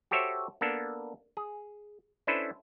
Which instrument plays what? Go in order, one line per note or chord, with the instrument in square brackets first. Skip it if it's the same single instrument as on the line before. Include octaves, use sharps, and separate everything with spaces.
[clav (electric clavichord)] F#4 G4 A4 C5 C#5 E5
A#3 B3 D4 A4
G#4
C#4 D4 E4 A4 B4 C5